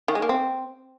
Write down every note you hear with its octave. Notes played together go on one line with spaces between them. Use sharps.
D#3
G#3
A#3
C4